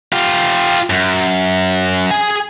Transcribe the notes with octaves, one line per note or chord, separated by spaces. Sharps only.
F4 G4
F#2
G#4 G#5